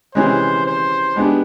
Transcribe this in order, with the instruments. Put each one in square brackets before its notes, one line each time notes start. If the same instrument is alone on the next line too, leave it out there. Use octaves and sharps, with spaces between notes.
[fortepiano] C3 E3 G#3 C#4 [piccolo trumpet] C5
[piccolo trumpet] C5
[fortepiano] G#3 B3 D4 G4